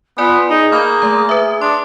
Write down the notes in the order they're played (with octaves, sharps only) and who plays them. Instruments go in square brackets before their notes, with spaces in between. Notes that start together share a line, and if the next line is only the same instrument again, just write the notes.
[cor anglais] B3 [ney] F4 [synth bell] B4 D5 G#5
[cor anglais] D#4 [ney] G#4
[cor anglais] A#3 [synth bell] B5 G6
[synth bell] A3 A#5
B4 E5
[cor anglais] D4 [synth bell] C6